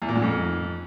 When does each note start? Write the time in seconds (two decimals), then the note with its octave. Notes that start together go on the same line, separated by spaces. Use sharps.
0.02 E2
0.08 A#2
0.15 G#2
0.22 F2